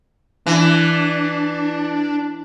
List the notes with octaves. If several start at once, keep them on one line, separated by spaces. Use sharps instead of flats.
E3 D4